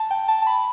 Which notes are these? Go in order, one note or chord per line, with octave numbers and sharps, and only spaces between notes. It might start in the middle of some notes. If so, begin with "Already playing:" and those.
Already playing: A5
G5
A5
A5
B5